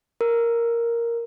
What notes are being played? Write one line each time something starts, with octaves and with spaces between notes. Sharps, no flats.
A#4